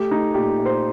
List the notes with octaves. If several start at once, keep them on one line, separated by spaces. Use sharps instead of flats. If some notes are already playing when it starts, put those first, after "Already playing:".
Already playing: A3 G4
A3 D#4
A#2 G4
A#2
C5